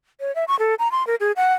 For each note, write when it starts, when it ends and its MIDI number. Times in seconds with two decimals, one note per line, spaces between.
0.20 0.34 73
0.35 0.44 76
0.48 0.58 85
0.59 0.75 69
0.79 0.90 82
0.92 1.05 84
1.07 1.15 70
1.20 1.32 68
1.36 1.54 78